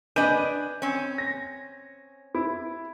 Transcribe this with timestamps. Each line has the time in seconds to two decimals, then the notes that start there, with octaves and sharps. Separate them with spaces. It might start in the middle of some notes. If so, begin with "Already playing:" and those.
0.16 D4 B4 D#5 G#5 G6 D#7
0.82 C4 C#4
1.18 A#6
2.35 E4